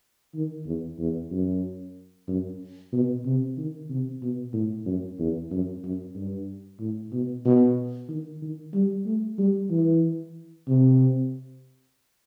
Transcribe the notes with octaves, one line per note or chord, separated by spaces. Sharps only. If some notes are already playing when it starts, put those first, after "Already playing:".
D#3
E2
E2
F#2
F#2
B2
C3
D#3
C3
B2
A2
F#2
E2
F#2
F#2
G2
A2
B2
B2
D#3
D#3
G3
A3
G3
E3
C3